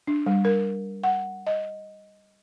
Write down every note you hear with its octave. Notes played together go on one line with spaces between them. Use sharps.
D4
G3
A#4
F#5
D#5